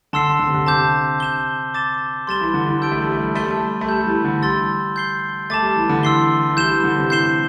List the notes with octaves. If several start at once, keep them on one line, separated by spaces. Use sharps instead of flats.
D3 A5 C6 E6 C7
D3
C3
D3
C3 A5 D6 G6
G6 E7 G7
D6 A6 E7 G7
G3 C6 A6 E7 G7
E3
D3
E3
G3 A5 E6 G6 D7 G7
A3
G3
A3
G3
A3 C6 A6 E7 G7
G3
A3
A3
G3 A5 E6 G6
G3
E3
D3
G3 C6 E6 A6
G6 C7 G7
A3 A5 D6 A6
G3
E3
D3
E3 C6 E6 C7 G7
E3
G3 G6 E7 G7
E3
G3
D3
C3
A2 G6 C7 E7 G7